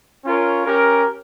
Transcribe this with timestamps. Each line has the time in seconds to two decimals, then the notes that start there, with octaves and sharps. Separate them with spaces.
0.25 C#4 F4 A#4 C#5
0.65 C#4 G4 A#4